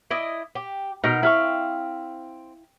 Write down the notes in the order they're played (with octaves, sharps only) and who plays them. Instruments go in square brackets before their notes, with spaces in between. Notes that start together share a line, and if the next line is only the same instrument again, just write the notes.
[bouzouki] E4 D5 D#5
G4
[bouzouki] B2 [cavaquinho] D#4 A#4
[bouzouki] C4 [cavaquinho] E4 F5 C#6